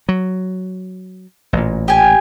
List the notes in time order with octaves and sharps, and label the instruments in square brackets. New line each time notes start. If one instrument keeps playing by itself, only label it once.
[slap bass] F#3
A1 A#2
[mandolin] G4 G#5